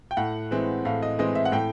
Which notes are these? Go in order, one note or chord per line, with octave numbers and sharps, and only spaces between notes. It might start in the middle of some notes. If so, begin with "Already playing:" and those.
G5
A2 F#5
E3 G#3 C4
A2 F5
D#5
E3 G#3 C4 D#5
E5
F#5
A2 G5